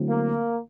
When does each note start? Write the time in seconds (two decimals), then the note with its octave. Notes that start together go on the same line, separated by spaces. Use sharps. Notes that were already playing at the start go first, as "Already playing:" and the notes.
Already playing: D3 F#3 A3 C4 E4
0.09 A#3